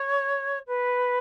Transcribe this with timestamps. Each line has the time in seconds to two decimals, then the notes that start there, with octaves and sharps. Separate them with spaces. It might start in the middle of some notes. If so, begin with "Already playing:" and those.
Already playing: C#5
0.67 B4